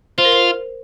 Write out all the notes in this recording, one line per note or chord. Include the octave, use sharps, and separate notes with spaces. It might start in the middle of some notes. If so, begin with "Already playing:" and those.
F4 C5
A#4
C5